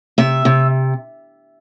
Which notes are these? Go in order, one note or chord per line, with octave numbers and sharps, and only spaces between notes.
C3 E5
C3